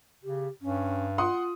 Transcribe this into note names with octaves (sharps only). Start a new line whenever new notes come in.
C#3 G4
G2 C#4
F4 F#5 C6 D#6